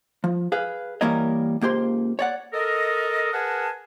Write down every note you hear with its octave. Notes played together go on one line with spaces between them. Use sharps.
F3
G#4 B4 F5
E3 G3 A#3 A#4 C#5 D#5
C#2 A#3 G4 C5 C6
C#5 D5 F#5
A4 A#4 D#5
G#4 A#4 B4 F#5 G#5 A5